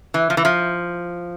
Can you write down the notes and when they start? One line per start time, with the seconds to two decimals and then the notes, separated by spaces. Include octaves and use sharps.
0.14 E3
0.30 F3
0.37 E3
0.45 F3